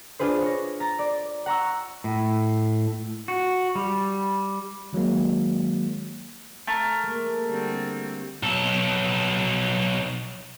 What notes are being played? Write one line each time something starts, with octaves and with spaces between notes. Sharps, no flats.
D4 F4 G#4 B4 C5
C#5 A#6
A#5 A6 A#6
D5
F#5 A#5 C#6 E6
A2
F#4
G3
D#3 F#3 G#3 A#3
A3 A#4
G#3 A#3
D3 G3 C4
B1 A4